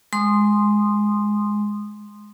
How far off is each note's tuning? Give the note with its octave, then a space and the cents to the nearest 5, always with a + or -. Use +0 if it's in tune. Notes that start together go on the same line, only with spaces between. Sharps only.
G#3 +0 C6 +0 D#6 -20